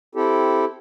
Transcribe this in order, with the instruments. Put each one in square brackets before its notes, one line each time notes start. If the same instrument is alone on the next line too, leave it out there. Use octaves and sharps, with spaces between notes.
[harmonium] C4 E4 G4 A4